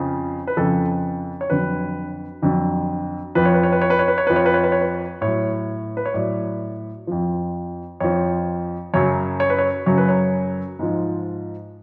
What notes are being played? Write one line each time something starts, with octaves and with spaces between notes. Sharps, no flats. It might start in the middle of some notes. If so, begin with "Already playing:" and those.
Already playing: F2 C#3 F3
B4
F2 C#3 F3 A4
C#5
F2 D3 F#3 B4
F2 D3 F#3
F2 F3 B4
C#5
B4
C#5
B4
C#5
B4
C#5
B4
C#5
F2 F3 B4
C#5
B4
C#5
B4
C#5
B4
A2 F#3 C#5
B4
C#5
A2 F#3 D5
F2 F3
F2 F3 C#5
F#2 C#3 F#3 C#5
C#5
B4
C#5
F#2 C#3 F#3 C#5
B4
C#5
G#2 F3